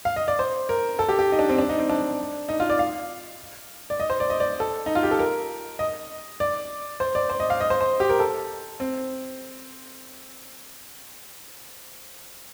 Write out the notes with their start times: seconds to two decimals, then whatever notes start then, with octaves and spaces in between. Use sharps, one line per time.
0.05 F5
0.16 D#5
0.28 D5
0.39 C5
0.69 A#4
0.99 A4
1.09 G4
1.19 G4
1.32 D#4
1.39 D4
1.49 C4
1.58 D4
1.69 D#4
1.79 C4
1.90 D4
2.49 D#4
2.60 F4
2.70 D5
2.79 F5
3.90 D5
4.00 D#5
4.10 C5
4.20 D5
4.30 D#5
4.40 D5
4.60 A4
4.86 D#4
4.95 F4
5.03 G4
5.11 A4
5.19 A#4
5.79 D#5
6.40 D5
7.00 C5
7.15 D5
7.30 C5
7.40 D#5
7.50 F5
7.61 D#5
7.70 C5
7.81 C5
8.00 G4
8.10 A#4
8.20 A4
8.80 C4